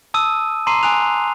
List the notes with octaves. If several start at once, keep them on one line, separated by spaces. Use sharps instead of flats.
A5 D#6 E6 D#7
A5 A#5 C6 D6 C7 D#7
G#5 A#5 D#6 F#6 F7